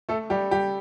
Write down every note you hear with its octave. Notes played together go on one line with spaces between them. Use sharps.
A3 A4
G3 G4
G3 G4